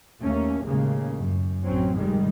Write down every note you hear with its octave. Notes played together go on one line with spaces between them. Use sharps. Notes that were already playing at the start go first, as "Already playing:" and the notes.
D#2 A3 A#3 C#4
D#2 A2 C#3 G#3 A#3
F#2
A1 F#3 C4 C#4
F1 G#2 D#3 G3 G#3